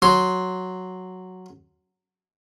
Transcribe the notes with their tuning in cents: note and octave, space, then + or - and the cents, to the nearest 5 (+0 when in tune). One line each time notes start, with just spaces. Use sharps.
F#3 +0 C6 +0